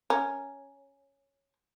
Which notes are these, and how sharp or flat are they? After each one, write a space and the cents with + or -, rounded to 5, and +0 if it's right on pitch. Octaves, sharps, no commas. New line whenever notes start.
C#4 +0 A#4 +0